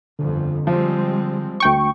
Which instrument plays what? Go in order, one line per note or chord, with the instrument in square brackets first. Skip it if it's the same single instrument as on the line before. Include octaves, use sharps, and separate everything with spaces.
[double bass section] G1 F2 [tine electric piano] D3
[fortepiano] F3 [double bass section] G3 G#3 C4
[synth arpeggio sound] D2 G5 C#6